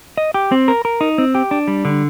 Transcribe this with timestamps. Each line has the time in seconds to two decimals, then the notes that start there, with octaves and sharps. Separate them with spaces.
0.18 D#5
0.34 G4
0.52 C4
0.68 A#4
0.85 A#4
1.01 D#4
1.18 C4
1.35 G4
1.51 D4
1.68 G3
1.85 D3